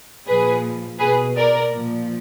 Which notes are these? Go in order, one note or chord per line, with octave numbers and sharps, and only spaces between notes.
A#2 F3 G#4 B4
B2 G#4 B4
A#4 D5
A#2 F3